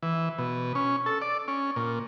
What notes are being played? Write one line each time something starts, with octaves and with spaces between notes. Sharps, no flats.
E3
B2
C#4
A4
D5
C#4
A#2